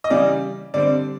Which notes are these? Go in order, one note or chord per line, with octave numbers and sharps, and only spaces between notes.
D#5
C#3 E3 G3 D5
D3 G3 C4 D5